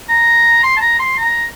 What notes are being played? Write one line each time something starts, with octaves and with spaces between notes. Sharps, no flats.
A#5
C6
A5
A#5
C6
A#5